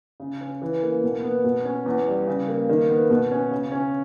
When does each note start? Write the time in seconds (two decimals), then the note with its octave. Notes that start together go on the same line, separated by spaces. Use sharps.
0.20 C#3
0.41 C#4
0.62 E3
0.83 A#3
1.04 B2
1.23 B3
1.44 B2
1.65 C#4
1.86 E2
2.07 G3
2.27 C#3
2.48 A#3
2.69 D#3
2.89 B3
3.10 B2
3.31 C#4
3.51 C#3
3.72 C#4